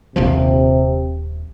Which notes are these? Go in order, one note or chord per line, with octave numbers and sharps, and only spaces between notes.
D#1 A#1 C3 F3